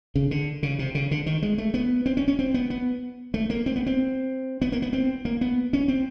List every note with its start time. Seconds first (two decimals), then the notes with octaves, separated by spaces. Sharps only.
0.16 C#3
0.31 D3
0.63 C#3
0.79 C3
0.95 C#3
1.11 D3
1.26 D#3
1.42 G#3
1.58 A3
1.74 B3
2.06 C4
2.17 C#4
2.28 C#4
2.39 C4
2.54 B3
2.70 B3
3.34 A3
3.50 A#3
3.66 C4
3.76 B3
3.86 C4
4.62 B3
4.72 A#3
4.82 B3
4.93 C4
5.25 A#3
5.41 B3
5.73 C#4
5.88 C4